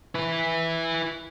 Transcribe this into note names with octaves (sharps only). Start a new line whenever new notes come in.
E4 B4